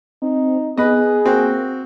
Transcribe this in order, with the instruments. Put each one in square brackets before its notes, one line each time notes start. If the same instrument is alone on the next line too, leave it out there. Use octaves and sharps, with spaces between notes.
[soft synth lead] C4 [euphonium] D#4
[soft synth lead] B3 [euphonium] G#4 [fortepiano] B4 D#5
[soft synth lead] A#3 [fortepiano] C4 F#4